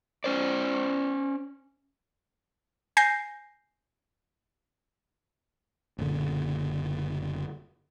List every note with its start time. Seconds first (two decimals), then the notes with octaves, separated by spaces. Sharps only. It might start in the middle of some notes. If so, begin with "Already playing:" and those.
0.24 C#4 C5 D5
2.97 G#5 G6 A#6 C7
5.98 F#1 A#2 D3